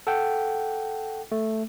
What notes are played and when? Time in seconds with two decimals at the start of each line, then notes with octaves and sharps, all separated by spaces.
0.07 A4 F#5 G5
1.32 A3